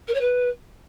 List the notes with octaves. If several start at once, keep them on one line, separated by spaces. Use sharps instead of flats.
A#4
C#5
B4